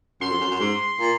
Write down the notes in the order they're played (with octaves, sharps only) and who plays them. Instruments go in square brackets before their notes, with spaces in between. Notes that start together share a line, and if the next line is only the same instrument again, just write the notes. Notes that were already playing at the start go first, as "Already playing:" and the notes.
[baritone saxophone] F#2 [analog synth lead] C6
[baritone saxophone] F2
F#2
F#2
G#2
A#2